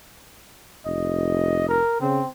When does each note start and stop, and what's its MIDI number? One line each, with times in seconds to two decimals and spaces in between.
0.86 1.80 29
0.86 1.68 75
1.69 1.96 70
2.01 2.22 49
2.01 2.28 60